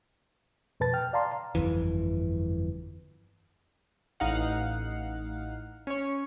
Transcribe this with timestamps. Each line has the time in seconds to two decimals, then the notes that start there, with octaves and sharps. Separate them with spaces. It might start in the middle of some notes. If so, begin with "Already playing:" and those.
0.80 F2 B2 B4 A5 A6
0.93 G5 F6
1.13 D5 F5 A5 A#5 C6
1.55 G1 F2 E3
4.20 A1 D#4 F5 F#5
5.87 C#4 C#5